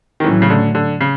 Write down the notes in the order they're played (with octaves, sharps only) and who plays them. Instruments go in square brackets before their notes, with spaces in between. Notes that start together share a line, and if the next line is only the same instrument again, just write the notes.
[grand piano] D#3
[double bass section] A2 F#3 A3 C#4 [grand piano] E3
[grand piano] C#3
D3
D3
C#3